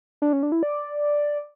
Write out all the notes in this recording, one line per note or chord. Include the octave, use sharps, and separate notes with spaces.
D4
C#4
D4
E4
D5